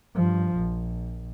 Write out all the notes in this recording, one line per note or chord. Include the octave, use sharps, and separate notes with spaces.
G2 F3
A#1